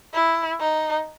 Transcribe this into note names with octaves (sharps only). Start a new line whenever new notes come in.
E4
D#4